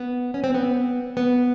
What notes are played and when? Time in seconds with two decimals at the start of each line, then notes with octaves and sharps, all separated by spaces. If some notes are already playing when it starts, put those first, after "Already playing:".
Already playing: B3
0.34 C#4
0.44 C4
0.54 B3
1.17 B3